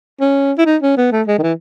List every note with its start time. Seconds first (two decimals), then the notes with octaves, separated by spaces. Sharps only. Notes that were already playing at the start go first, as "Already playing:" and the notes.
0.21 C#4
0.58 E4
0.66 D#4
0.82 C#4
0.97 B3
1.12 A3
1.28 G#3
1.39 D#3
1.42 E3